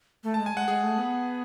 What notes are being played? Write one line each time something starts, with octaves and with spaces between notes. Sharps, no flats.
A3
G#3 A5
G#5
G#3 F#5
G#3 G#4
A3
B3